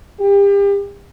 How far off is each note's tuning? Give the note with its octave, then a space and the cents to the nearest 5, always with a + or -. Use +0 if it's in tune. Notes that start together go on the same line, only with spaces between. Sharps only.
G4 +35